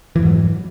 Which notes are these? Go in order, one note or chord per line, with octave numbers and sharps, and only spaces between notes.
F2 G#2 E3 F#3